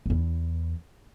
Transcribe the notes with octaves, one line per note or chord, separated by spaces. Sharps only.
E2 E3